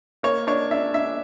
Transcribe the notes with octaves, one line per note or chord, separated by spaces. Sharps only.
A#3 C#5
D4 C#5
D4 E5
D4 E5